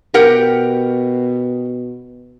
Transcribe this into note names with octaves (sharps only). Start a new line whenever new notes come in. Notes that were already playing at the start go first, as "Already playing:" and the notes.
B2 G4 A#4 F#5